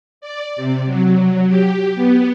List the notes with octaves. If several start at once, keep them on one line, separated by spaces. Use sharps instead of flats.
D5
C3
F#3
G4
B3